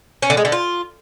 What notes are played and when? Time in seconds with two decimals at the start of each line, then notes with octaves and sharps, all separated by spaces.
0.22 C#4
0.30 D3
0.37 G#3
0.45 D3
0.52 F4